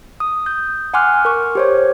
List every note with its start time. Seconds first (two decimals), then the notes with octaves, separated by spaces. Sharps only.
0.20 D#6
0.46 G6
0.94 F#5 G#5 C6 D6 F6 F#6
1.25 A#4 C#6
1.55 G4 C5 C#5